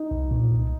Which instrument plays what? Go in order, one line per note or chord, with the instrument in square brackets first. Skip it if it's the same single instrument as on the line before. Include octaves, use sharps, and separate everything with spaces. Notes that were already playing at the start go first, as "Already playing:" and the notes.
Already playing: [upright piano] D#4
[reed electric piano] C2
A#2
C2